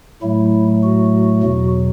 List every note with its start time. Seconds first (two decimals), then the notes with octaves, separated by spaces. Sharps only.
0.22 A2 F#3 A3 E4
0.83 F#4
1.43 E2 B2 F#3